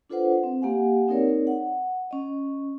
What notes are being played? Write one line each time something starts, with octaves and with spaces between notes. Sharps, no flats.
D4 F4 A4 B4 C5 F#5
C4
A#3 G4 F5 F#5 G#5
C4 D#4 G#4 A#4 C#5 D5
F#5
C#4 D#5